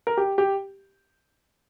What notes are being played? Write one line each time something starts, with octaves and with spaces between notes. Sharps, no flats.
A#4
G4
G4